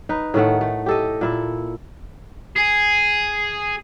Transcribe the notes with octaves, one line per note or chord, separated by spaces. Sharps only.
D#4 B4
A2 D#3 A3 F#5
A3
G4 A4 D#5
A#2 E4 A4
G#4